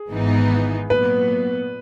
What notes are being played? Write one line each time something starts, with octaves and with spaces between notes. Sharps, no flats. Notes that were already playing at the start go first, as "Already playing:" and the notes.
Already playing: G#4
G#1 G#2 E3 B3 D#4
A#2 F#3 B3 B4